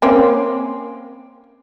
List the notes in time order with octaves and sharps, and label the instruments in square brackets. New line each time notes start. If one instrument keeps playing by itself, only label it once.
[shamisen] A#3 C4 C#4